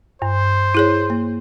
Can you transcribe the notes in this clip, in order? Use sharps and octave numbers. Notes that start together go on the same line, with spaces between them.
G2 C5
E4 G#4 C#5
A#3